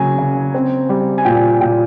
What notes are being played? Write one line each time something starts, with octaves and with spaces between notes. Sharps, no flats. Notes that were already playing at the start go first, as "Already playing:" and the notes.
Already playing: C#3 F#3 A#3 G#5
C#3
C4
G3
G#5
A#2 G5
A#2 G5